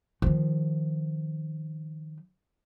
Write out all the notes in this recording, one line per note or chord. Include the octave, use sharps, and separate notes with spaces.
D#3 F3